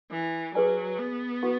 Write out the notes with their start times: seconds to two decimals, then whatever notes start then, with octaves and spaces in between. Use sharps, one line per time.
0.11 E3
0.54 F#3 G#4 B4 D5 G#5
0.99 B3
1.43 F#4 B4 F#5 C#6